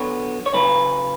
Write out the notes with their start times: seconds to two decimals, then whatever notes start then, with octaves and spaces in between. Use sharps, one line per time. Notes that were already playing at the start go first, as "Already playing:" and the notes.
Already playing: D3 F#3 B3 C#5
0.46 C#5
0.53 C#3 F#3 B4